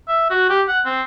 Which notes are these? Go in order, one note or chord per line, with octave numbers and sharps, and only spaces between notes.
E5
F#4
G4
F#5
C4